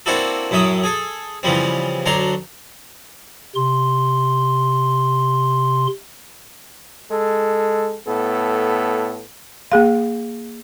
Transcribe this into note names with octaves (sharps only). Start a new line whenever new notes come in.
A#3 C4 D4 E4 F#4 A4
F#2 A2 F#3 E5 D#6
G#4 A4
C#3 E3 F3 G3 C4
D2 F#3 D4 A#5 C6
C3 C6
G#3 A4
A2 B3 A4
A#3 G#4 F5